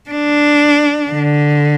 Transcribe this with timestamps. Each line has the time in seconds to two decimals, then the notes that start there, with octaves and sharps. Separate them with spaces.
0.10 D4
1.11 D3